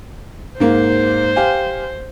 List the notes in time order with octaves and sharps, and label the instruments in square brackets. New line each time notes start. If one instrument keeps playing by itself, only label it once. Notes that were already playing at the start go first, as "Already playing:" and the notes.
[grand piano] G#2 A#3 [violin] C5
[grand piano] G4 F5 G#5